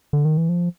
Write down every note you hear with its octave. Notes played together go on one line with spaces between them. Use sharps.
D3
D#3
E3
F3